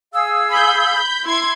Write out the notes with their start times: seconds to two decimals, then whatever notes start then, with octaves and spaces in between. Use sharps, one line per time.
0.13 G#4 F5 E6
0.51 B5 G6
1.24 E4 C6 G#6